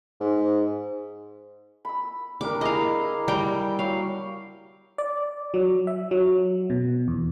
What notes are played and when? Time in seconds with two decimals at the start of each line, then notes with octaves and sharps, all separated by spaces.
0.20 G#2
1.85 B5 E6
2.41 G3 D4 A#4 D6
2.61 E4 G#4 D#5 F5 A#5
3.28 G3 A#4 G5 A5
3.79 F#3 F5 G5
4.98 D5
5.54 F#3
5.87 E5
6.11 F#3
6.70 B2
7.08 E2